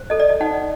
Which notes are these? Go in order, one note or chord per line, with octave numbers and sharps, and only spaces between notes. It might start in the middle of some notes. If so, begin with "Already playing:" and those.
Already playing: C5
A4 D#5
D5
D#5
D#4 F#5